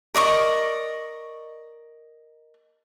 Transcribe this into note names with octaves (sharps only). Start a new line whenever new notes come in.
A#4 D5 D#5 C#6